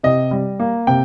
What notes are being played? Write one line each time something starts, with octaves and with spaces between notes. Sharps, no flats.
C3 D#5
G3
A#3
C3 G5